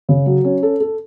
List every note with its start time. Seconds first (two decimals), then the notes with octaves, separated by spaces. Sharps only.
0.09 C#3
0.26 F#3
0.44 C#4
0.63 A4
0.80 A4